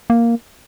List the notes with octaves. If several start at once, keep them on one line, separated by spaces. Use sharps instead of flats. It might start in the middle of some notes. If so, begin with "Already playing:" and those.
A#3